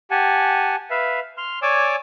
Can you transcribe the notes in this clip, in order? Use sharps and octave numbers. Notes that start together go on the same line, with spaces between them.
G4 F#5 G#5 A5
B4 E5 F5
C6 F6
C#5 D5 G#5 D6 E6